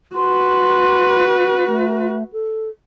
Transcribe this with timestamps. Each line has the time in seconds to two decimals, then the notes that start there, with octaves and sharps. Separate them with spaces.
0.15 F#4 B4 C6
1.67 A3
2.32 A4